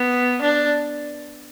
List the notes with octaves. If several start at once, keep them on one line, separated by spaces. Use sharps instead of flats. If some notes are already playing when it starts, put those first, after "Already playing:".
Already playing: B3
D4